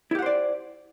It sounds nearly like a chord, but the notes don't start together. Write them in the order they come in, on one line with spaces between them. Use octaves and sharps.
E4 G4 F#5 C5 D5